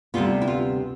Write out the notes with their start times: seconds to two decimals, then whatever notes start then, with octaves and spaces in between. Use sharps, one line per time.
0.14 D2 C3 G3 B3 F4
0.42 E4
0.48 F4